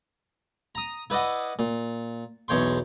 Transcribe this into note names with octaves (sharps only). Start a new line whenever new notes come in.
A#5 D#6
E4 B4 D5 D#5 F#5
A#2
B1 E2 C#5 G5 C6